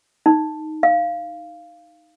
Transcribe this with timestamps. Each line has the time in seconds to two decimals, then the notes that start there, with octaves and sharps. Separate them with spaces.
0.26 D#4
0.83 F5